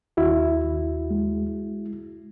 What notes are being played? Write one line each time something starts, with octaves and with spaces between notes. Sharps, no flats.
D#2 E4 F#4
D#2
G#3